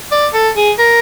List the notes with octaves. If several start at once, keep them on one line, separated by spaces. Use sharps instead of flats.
D5
A4
G#4
A#4